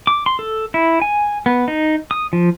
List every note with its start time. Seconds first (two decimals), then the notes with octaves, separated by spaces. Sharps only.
0.07 D6
0.26 C6
0.39 A4
0.74 E4
1.02 G#5
1.46 B3
1.68 D#4
2.11 D#6
2.33 F3